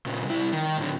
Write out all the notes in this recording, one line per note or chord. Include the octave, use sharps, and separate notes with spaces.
A#2 C#3
C2 E4
D#3
A2 D3